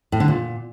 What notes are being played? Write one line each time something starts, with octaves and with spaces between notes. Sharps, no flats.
A2
D3
A#2